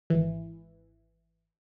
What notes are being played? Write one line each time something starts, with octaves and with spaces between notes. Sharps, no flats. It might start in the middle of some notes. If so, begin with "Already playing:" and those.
G#1 E3